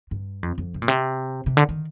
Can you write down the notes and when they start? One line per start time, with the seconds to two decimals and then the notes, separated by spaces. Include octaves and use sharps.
0.11 G2
0.43 F2
0.58 F2
0.74 C3
0.82 A#2
0.88 C3
1.46 C3
1.57 D3
1.69 D#3